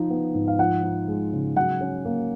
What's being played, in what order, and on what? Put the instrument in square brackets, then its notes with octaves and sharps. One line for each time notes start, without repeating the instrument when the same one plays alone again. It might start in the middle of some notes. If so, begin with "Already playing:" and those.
Already playing: [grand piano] F3 D#4
B3
G#2
F5
F3 F#5
D#4
G#3
C#3
F#3 F#5
C#4
A#3